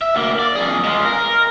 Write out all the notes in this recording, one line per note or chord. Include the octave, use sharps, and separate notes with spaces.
E5
D2 A#3
D5
F2 G#4
G#3 F4
A#4